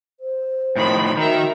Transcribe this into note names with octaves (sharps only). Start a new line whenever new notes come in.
C5
A2 D#3 F3 B5
D#3 F#4 A#4 E5 A#5